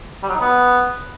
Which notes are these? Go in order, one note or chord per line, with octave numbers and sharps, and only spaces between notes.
G3
F#3
D#4
B3